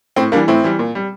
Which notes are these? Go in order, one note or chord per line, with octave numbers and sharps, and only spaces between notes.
A2 C4
E3 G3 A#3 D4
A2 C4 E4
E3 G3
A#2
G3